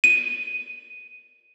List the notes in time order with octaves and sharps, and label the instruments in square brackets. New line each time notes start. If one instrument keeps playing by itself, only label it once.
[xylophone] D#7